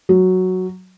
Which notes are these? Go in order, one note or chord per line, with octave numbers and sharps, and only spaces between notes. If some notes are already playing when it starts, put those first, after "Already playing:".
F#3